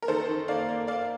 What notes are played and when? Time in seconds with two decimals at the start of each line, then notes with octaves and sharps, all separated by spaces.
0.02 A#4
0.08 D#3 A4 C5
0.29 D#3
0.48 A#3 D5 F5
0.69 A#3
0.87 A#3 D5 F5